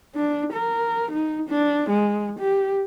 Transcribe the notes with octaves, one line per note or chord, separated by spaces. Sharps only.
D4
A#4
D#4
D4
G#3
G4